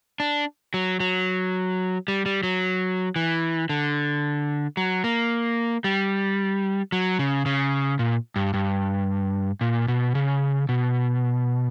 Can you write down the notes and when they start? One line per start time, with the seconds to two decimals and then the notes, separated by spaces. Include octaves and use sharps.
0.20 D4
0.74 F#3
1.00 F#3
2.08 G3
2.26 G3
2.43 F#3
3.16 E3
3.69 D3
4.77 F#3
5.04 A#3
5.84 G3
6.92 F#3
7.19 C#3
7.46 C#3
7.99 A#2
8.36 G2
8.54 G2
9.61 A#2
9.88 B2
10.15 C#3
10.69 B2